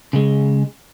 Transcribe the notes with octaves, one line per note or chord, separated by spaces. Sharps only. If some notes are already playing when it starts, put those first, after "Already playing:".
C#3 G#3